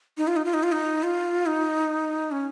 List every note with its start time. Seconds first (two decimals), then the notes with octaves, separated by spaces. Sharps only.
0.17 D#4
0.28 F4
0.36 D#4
0.45 F4
0.54 D#4
0.63 F4
0.72 D#4
1.03 F4
1.46 D#4
2.31 C#4